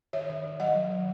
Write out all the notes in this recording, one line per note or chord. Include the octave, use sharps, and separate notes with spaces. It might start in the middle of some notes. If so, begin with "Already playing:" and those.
D#3 C#5 E5
D#3
D#3
F#3 D#5 F#5
F#3
D#3